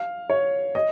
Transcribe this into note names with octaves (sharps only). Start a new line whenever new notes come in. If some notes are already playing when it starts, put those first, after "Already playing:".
Already playing: F5
C#5
D#5